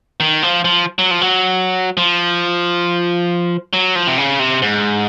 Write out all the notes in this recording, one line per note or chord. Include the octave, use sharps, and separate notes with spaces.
D#3
F3
F3
F#3
F3
F#3
F3
F#3
F3
C3
C#3
C3
G#2